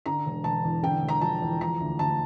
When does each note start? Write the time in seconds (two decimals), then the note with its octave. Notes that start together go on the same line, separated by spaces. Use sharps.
0.06 D3 A#5
0.26 E1
0.44 E1 A5
0.64 E2
0.83 D3 G5
1.02 E1
1.09 A#5
1.21 F3 A5
1.42 E2
1.61 F3 A#5
1.80 D2
1.99 D2 A5